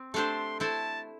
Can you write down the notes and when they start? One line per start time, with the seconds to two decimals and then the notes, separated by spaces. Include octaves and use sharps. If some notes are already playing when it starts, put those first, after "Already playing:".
Already playing: C4
0.14 A3 D4 G4 C5 C6
0.60 A3 E4 C5 A5